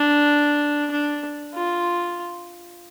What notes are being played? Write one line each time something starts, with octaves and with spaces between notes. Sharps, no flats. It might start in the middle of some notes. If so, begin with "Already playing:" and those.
Already playing: D4
D4
F4